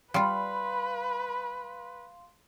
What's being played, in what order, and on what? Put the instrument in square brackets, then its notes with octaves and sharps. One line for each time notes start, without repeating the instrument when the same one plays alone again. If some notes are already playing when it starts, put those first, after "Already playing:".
[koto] G3 F4 [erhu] B4 [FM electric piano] F5 C6 [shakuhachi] B5